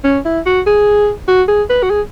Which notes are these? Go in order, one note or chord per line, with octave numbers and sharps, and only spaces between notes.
C#4
E4
F#4
G#4
F#4
G#4
B4
F#4
G#4